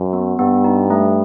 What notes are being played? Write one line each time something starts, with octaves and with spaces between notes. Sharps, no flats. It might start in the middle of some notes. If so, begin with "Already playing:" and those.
Already playing: F#2
B3
G2 B3
D#4
A3